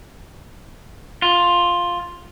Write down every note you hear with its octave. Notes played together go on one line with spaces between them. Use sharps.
F4